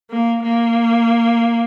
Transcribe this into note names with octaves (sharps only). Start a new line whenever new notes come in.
A#3
A#3